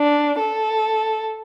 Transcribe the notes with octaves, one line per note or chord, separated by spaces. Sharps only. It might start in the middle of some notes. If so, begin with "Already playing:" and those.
Already playing: D4
A4